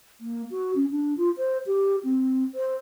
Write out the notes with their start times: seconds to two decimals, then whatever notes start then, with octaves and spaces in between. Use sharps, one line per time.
0.21 A#3
0.51 F#4
0.75 C#4
0.91 D4
1.18 F4
1.37 C5
1.66 G4
2.04 C4
2.55 C5